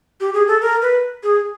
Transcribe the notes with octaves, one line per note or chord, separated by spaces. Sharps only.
G4
G#4
A4
A#4
B4
G#4